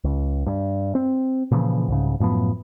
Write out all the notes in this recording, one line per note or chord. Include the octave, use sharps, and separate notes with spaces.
C#2
G2
C4
A#2 C#3 E3 F3
C2 G#2 C#3
F#2 A2 F3 B3